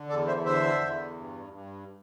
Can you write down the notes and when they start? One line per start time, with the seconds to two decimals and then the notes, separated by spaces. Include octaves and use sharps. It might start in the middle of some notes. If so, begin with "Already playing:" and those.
Already playing: D3
0.09 E2 A4 D5
0.27 C5 E5
0.46 D3 C5 E5
0.81 E2
1.17 G2
1.53 G2